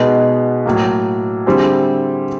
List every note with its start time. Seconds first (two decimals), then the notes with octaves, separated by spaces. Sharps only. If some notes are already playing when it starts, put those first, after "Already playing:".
Already playing: B2 G#3 B3 D#4
0.66 A2 F#3 A#3
1.46 D3 G3 C4 E4 G#4